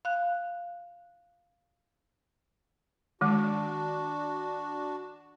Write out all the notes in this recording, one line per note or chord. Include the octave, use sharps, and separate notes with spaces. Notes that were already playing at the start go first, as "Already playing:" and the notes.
F5 F#6
D#3 G#3 D4 F#4